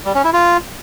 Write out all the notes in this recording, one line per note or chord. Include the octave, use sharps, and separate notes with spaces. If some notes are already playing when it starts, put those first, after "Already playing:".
G3
C#4
E4
F4